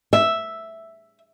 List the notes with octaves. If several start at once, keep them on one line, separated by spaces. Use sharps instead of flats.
E5